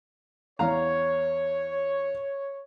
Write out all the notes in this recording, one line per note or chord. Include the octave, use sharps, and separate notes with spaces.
E2 C#5 F5 A#5